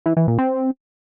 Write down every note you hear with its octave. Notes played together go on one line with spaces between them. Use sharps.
E3
E3
A#2
C4